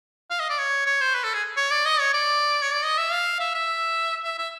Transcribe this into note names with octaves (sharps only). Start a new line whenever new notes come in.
F5
D#5
D5
C#5
C#5
C5
B4
A4
G#4
C#5
D5
D#5
C#5
D5
C#5
D5
D#5
E5
F5
E5
E5
E5
E5